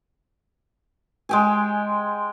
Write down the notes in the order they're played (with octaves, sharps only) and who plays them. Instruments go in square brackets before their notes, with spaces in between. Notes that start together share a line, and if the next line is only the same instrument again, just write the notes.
[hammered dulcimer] G#3 G5 G#5